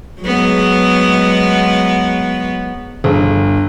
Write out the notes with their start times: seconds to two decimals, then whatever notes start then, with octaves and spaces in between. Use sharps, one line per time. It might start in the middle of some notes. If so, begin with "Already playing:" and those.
0.22 F#3 G#3 B3
3.04 G1